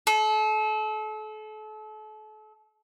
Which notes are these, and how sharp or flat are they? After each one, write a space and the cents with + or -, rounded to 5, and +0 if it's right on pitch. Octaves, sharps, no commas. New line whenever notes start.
A4 -35